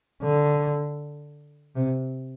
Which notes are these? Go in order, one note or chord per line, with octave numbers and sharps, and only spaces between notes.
D3
C3